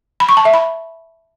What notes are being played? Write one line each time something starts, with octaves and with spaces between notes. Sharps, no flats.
B5
C#6
A5
E5
B5